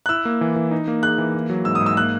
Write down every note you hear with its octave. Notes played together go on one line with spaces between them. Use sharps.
F#6
E4 E6
A#3
E3
E3
D#4
A#3
G#4 F#6
E3
A#3
F#3
G#2 E6
D#6
G#2
E6
A#3 F#6